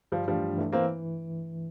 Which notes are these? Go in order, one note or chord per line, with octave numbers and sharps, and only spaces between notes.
G2 F3 G3
E3 F3 G3 A3 D4
G2
E3 A3 D4
E3 A#3 C4